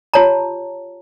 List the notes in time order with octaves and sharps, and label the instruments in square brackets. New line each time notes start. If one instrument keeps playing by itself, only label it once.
[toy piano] F4 G4 C#5 A5 A#5